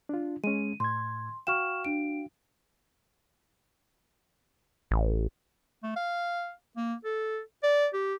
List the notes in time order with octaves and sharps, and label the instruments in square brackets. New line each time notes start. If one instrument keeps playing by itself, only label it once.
[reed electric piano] D4 F4
[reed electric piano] G#3 C#4 [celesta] D#7
[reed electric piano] A2 G#6 [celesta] C6
[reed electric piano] F#4 F5 G5 [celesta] C#6 F6 E7
[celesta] D4 D7
[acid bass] A1
[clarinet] A3
F5
A#3
A4
D5
G4